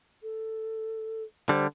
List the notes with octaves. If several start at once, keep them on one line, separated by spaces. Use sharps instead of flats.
A4
D3 G3 C5